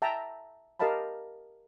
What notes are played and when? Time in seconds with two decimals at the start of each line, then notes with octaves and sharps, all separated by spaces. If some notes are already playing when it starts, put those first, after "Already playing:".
0.02 E5 G5 A5 A#5
0.79 G4 A#4 D#5 F5 A5 B5